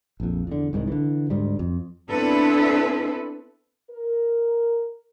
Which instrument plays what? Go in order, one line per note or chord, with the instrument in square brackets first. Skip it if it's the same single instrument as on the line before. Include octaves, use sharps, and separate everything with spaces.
[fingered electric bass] A#1 F2
E2 D3
C2 G#2 D3 D#3
D3 E3
D2 G#2 G3
F2
[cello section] B3 C4 D4 E4 A4 B4
[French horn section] A#4